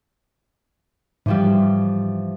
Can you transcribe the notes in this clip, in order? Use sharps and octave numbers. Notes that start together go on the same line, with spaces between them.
G#2 E3 F3 G3